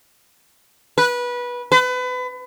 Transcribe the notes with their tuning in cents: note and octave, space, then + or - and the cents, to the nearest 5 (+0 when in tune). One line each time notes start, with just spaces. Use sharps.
B4 -20
B4 +30